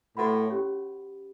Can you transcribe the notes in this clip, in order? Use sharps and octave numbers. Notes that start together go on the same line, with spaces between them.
A2 F#4 B4 F#5 B5
C#4 G4 C#5